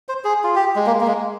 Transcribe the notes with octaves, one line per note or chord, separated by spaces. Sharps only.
C5
G#4
F4
G4
G#3
A#3
A#3
G#3